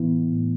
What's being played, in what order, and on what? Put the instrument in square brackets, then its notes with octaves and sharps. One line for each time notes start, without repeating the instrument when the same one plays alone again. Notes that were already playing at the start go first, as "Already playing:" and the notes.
Already playing: [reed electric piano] A2 E3 B3 E4
A2